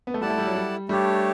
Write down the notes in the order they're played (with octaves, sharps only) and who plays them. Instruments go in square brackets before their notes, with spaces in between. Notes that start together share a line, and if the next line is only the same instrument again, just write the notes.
[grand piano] B3
A3
[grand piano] G3 [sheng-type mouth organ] E4 A4 D5 F#5 A5
[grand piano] A3
G3
F#3
G3
[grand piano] G3 [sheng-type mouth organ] A3 D4 G4 C#5